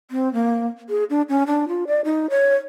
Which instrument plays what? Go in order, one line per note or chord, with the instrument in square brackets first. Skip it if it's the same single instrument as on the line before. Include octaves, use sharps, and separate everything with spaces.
[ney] C4
A#3
G#4
D4
C#4
D4
F4
D5
D#4
C#5